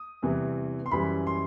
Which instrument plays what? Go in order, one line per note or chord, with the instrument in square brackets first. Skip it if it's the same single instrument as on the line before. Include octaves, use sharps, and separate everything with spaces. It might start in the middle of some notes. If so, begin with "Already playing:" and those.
Already playing: [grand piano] D#6
E2 C3 E3 G3
C6
F#2 E3 G3 B5
C6